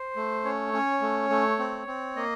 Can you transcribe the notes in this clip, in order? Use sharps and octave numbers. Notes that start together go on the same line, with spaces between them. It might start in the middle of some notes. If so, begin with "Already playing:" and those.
Already playing: C5
A3
C#4 C#5
C#4
A3
A3
C4
C4
A#3 D#5